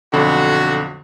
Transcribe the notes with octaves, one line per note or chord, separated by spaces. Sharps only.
B1 F2 D3 F#4